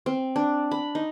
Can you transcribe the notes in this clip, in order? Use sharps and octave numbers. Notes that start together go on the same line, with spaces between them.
C4
D4
B5
D#4